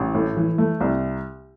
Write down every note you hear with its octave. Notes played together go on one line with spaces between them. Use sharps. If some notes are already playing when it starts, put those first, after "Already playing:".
Already playing: A1
A2
E3
A3
C2